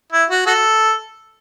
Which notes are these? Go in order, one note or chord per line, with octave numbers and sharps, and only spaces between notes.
E4
F#4
F#4 A4